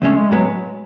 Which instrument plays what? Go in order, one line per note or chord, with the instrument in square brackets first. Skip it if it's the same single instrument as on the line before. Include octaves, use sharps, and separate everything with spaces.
[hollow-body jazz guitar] E2 C#3 G#3 C#4 [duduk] A3
[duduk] G#3
[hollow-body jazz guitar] A2 G#3 B3 [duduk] F#3